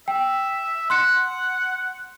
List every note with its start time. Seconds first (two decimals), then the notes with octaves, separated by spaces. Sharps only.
0.08 E5 G5
0.90 F#5 C6 F#6 C#7